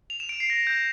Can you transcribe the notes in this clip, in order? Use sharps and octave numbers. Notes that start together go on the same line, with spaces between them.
F7
E7
D7
C7
A#6
G6